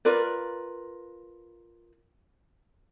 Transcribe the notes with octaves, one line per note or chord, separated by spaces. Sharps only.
F4 A#4 B4 D5